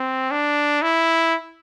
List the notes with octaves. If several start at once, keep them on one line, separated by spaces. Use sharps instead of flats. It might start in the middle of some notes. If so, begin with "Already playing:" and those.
Already playing: C4
D4
E4